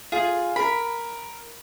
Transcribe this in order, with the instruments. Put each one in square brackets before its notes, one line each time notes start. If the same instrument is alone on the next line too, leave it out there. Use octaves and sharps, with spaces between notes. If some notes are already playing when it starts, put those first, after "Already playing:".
[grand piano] F4 [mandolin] G#4
[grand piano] A#4 [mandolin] B5